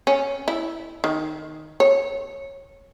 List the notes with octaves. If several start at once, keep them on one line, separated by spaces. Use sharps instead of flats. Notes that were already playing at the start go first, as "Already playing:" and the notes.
C#4
E4
D#3
C#5